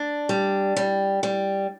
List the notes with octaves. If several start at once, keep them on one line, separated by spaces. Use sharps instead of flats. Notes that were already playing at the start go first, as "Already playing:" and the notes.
Already playing: D4
G3
G3
G3